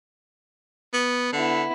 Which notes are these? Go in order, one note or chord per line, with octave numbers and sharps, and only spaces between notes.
B3
D3 B3 E4